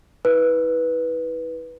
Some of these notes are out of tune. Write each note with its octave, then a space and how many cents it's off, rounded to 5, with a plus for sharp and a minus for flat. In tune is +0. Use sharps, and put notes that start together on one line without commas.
E4 -35 B4 -10